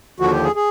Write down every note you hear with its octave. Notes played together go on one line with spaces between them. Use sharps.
D#2 D3 F3 F#4
G4
G#4
G#4